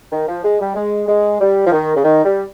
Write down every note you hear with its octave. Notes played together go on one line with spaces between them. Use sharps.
D#3
F3
G#3
G3
G#3
G#3
G3
F3
D#3
C#3
D#3
G3